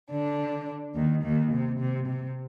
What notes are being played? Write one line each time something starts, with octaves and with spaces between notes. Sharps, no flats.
D3 D4
D#2 D#3
D#2 D#3
C3
C3
C3